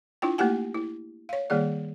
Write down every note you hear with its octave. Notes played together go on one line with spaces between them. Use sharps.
D4 E4 F4 G5
A3 A#3 E4 G4 F#5 G#5
E4
C#5 F5
D#3 G3 A#3 G#4 D5